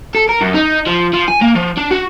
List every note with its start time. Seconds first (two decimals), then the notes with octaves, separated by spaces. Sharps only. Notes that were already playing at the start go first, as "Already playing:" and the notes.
0.15 A4
0.29 A#4
0.41 F#2
0.54 D#4
0.86 F3
1.13 F3
1.28 G#5
1.41 A#3
1.55 F3
1.78 D4
1.91 F#4